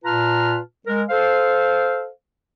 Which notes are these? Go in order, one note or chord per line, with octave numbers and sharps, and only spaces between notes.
A#2 F4 B4 A5 A#5 F6
G#3 A#4
A4 C5 F5